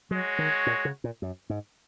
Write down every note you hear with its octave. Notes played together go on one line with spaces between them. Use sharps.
F#3 G#3 F#4 C#5
D#3
A#2
C#3
A#2
F#2
G#2